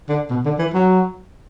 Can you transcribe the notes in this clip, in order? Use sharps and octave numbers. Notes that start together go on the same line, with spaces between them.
D3
B2
D3
E3
F#3